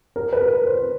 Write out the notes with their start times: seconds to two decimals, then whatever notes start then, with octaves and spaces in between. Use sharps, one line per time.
0.16 A#4
0.33 B4
0.41 A#4
0.67 C5